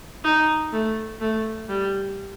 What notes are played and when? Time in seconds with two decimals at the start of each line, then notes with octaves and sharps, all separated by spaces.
0.24 D#4
0.72 A3
1.21 A3
1.69 G3